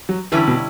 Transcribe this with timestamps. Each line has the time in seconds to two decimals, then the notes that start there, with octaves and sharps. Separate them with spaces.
0.09 F#3
0.32 D3 E3 G3 C#4 E4
0.47 B2